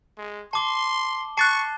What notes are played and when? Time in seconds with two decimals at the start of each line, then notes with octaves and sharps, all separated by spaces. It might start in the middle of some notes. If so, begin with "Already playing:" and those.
0.18 G#3
0.53 A5 C6 D6 G7
1.37 A5 C#6 F#6 A6 C7